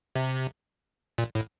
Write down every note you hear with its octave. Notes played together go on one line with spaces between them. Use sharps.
C3
A#2
A2